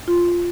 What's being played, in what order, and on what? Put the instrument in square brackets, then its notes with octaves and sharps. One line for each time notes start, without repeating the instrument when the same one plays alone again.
[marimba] F4